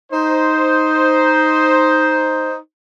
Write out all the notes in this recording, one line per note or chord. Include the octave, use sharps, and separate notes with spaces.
D#4 C5